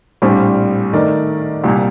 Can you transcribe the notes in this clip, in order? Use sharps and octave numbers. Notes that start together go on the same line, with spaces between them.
A#1 A2 G3 C4
D#3 A3 D#4 A#4 D5
C2 A#2 G3